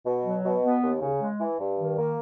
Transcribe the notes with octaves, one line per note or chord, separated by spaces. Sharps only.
B2
F#3
B2
B3
D#2
C#3
G#3
E3
G2
D#3
A#3